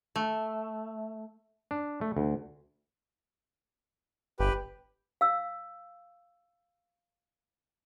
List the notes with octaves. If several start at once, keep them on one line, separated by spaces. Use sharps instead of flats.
A3
D4
A3
D2
G1 G4 B4
F5 E6